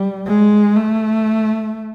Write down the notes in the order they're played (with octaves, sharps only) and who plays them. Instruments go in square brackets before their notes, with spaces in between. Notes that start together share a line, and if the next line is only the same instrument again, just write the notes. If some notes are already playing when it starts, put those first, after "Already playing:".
Already playing: [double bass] G3
G#3
A3